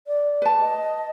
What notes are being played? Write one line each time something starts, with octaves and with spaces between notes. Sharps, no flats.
D5
B4 A5
D#5